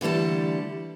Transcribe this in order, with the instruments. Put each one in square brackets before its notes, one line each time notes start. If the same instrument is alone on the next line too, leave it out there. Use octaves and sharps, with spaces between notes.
[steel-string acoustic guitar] D3 E3 G3 A3 A5